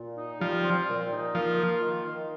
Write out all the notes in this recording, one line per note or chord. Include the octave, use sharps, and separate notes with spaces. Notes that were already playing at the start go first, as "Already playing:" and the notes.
Already playing: A#2
D#4
F3 G3
C4
A#2
D#4
F3 A#3
F4
D#3
D#3